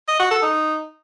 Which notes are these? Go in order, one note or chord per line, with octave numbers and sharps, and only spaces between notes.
D#5
F#4
A4
D#4